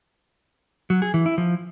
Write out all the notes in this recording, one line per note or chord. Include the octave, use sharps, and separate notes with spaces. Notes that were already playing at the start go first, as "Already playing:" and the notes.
F#3
G#4
E3
E4
F3